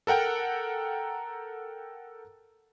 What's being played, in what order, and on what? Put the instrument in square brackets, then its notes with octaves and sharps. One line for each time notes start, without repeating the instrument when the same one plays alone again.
[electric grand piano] A4 A#4 F#5 G5 A#5